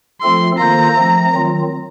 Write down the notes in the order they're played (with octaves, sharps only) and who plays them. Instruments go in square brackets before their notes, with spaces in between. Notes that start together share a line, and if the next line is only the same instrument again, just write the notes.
[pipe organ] F3 A3 C4 F4 A4 [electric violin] C6
[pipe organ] D#3 A#3 F4 A4 C5 [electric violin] A#5
[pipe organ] F3 A3 C4
D#3 F#3 C4 F4